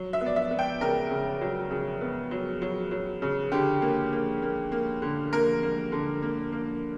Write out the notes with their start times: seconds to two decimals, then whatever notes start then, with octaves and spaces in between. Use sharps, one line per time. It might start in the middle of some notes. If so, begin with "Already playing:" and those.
Already playing: F#3
0.13 E5
0.21 B3
0.26 D5
0.36 E5
0.51 B3
0.59 G5
0.81 C#3 A#4
1.11 C#3
1.41 F#3
1.71 C#3
2.01 B3
2.31 F#3
2.62 F#3
2.91 F#3
3.22 C#3
3.52 D3 G4
3.82 A#3
4.12 A#3
4.42 A#3
4.72 A#3
5.02 D3
5.33 A#3 A#4
5.63 A#3
5.92 D3
6.22 A#3
6.52 A#3